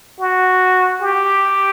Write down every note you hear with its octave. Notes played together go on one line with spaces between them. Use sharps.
F#4
G4